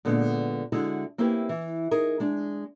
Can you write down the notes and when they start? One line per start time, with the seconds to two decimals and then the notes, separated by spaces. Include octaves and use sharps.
0.05 A#2 D3 G#3 B3
0.72 D3 G#3 E4 F#4
1.18 A#3 C4 C#4 E4 G4 B4
1.49 E3
1.91 D#4 G#4 A#4
2.20 G#3 D4